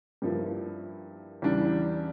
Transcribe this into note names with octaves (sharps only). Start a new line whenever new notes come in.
G2 F3 A#3 E4
E2 C#3 E3 G3 D4